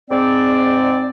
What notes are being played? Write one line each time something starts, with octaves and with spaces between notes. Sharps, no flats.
G#2 C4 D5